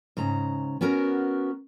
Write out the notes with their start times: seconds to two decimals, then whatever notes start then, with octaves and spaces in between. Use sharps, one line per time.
0.17 G#2 C#3 A#5
0.81 B3 C#4 F#4 A#4